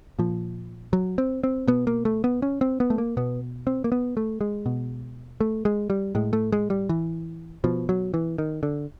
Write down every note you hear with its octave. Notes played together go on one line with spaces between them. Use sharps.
A#2 F3
F#3
C4
C4
B2 B3
A#3
A3
B3
C#4
C4
B3
A3
A#3
B2 B3
C4
A#3
B3
A3
G#3
B2
A3
G#3
G3
A2 G#3
A3
G#3
G3
E3
B2 F3
F#3
E3
D#3
D3